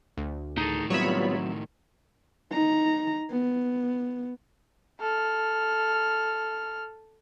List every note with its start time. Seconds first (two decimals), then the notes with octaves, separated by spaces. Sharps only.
0.17 D2
0.58 A2 D#3 D#4 G#4 A4
0.90 F#3 G3 B3 C4 F4 C#5 E5 B5
2.52 D#4 A#5
3.31 B3
5.00 A4 F6